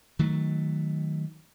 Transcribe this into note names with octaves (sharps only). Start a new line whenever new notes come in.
D#3 F#3 A3